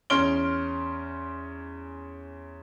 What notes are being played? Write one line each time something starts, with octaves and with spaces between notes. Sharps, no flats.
E2 C#4 C6 F6 D7 G7